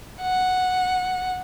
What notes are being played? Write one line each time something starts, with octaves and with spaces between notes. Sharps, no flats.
F#5